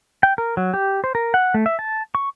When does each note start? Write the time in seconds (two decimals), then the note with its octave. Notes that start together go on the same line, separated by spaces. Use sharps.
0.23 G5
0.38 A#4
0.57 F#3
0.74 G4
1.04 C5
1.15 A#4
1.34 F#5
1.54 A3
1.66 E5
1.79 A5
2.15 C#6